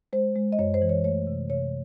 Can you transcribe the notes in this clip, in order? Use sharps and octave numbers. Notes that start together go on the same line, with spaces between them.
G#3 C5
G#3
D#5
F#2 C#5
C5
E3
C#5
A3 C#5
C3
C3 C#5